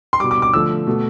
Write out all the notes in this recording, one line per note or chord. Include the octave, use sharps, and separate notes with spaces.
C6
B2 G3 D6
D6
D6
D3 F3 A3 E6
B2 A3